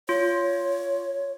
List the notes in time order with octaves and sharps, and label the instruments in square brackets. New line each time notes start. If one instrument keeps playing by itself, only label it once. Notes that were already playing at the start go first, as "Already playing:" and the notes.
[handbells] F4 [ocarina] C#5